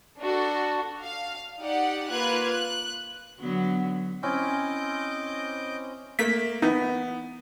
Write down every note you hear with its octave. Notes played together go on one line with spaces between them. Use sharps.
D4 F#4 A4
F5
D#4 G4 D5 F#5
A#3 F4 B4 F#6 G#6
F#6
D3 F#3 B3
C4 C#4 E4 D#5 D6 G6
A3 A#3 B6
E3 B3 D#4